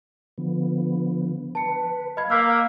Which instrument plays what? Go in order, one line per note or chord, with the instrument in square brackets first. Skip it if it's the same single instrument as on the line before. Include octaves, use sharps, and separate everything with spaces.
[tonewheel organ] D3 F3 B3
[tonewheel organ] B4 [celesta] A5 C#7
[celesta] D#5 B5 G#6 [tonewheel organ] F5
[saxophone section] A#3 [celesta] E6 G6 B6